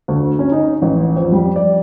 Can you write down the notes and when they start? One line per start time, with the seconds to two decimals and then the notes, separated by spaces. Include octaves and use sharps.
0.08 D2
0.39 C#4
0.52 D#4
0.82 A1
1.16 F2
1.32 G3
1.56 D5